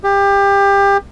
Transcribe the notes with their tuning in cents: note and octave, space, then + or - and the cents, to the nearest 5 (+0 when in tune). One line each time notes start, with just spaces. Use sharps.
G4 +25